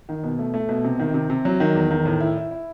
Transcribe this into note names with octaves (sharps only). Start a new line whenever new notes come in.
D#3
B2
A3
A3
B2
C3
D#3
C3
C3
F#3
D#3
E2
D#3
A2
E4
E4
E4